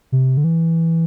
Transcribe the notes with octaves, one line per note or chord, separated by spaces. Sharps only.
C3
D3
E3